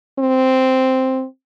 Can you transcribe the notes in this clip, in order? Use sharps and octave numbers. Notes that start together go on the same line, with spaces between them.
C4